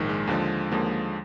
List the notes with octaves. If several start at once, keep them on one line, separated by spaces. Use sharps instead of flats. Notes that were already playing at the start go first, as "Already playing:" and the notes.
Already playing: A#1 G#2 D#3
G#3
D#2 D3 F3 G#3
D#2 D3 F3 G#3 A#3